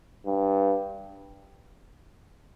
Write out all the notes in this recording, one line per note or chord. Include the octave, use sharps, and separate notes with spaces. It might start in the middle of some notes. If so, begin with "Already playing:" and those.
G2